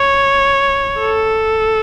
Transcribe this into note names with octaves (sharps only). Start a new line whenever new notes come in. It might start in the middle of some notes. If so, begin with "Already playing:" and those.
Already playing: C#5
A4